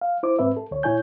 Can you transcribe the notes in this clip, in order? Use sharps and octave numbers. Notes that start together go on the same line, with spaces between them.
F5
E4 C5 D6
G#2 C4 B4 E5
A4
D2 C#5
A#2 E4 C#5 G#5 G6